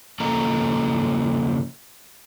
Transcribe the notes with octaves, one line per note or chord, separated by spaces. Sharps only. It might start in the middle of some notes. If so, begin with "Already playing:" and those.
C#3 F3 A#3 A4 D#5 A#5